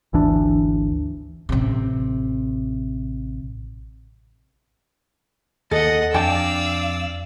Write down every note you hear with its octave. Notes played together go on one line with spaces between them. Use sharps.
G#1 D2 E3 D4
A1 C3
D#2 D#3 A4 D#5 F#5
F2 D4 D5 F5 G5 A5 E6